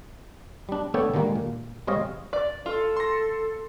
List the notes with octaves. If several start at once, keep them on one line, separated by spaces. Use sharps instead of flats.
G3 D4
A3 B3 D4 A4 C#5 G5
D3 D#3 G3 G#3 A#3
A#2
G3 G#3 C4 C#5 D#5 F5
D5
F4 A4
C6 A#6